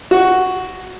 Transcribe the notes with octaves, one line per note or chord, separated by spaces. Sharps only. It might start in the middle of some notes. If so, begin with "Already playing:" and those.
F#4